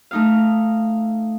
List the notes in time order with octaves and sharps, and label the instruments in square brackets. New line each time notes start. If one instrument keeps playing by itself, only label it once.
[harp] A3 D#4 F5